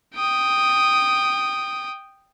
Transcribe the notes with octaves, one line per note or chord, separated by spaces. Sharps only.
G5 D#6